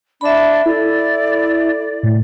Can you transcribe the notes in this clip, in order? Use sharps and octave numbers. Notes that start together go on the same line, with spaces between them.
D4 E5 B5
E4 A4 D5
A2